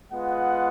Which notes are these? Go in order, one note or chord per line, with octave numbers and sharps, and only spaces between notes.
G#3 B3 F4 F#5